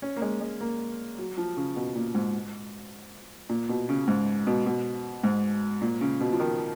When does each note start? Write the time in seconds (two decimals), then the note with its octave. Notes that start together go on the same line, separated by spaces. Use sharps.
0.02 C#4
0.16 A#3
0.22 G#3
0.41 G#3
0.61 A#3
1.18 F#3
1.38 F3
1.57 C#3
1.76 B2
1.95 A#2
2.14 G#2
3.49 A#2
3.69 B2
3.89 C#3
4.08 G#2
4.47 B2
4.66 B2
5.24 G#2
5.82 A#2
6.01 C#3
6.20 B2
6.32 F3
6.40 D#3